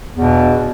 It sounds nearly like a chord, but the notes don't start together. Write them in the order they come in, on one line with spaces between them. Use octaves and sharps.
E2 G2 B2